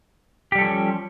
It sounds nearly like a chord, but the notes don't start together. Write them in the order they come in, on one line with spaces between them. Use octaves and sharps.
G4 G3 A4 F3 C#4